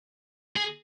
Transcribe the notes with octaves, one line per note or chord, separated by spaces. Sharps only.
G#4